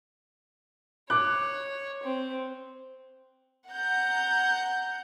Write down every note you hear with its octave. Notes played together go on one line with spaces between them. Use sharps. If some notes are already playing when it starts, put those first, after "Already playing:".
C#5 D6 F#6
C4
F#5 A#5 G6